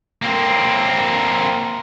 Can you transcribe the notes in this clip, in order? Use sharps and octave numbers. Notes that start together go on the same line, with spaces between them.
A#3 C4